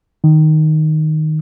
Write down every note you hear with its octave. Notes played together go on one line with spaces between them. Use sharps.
D#3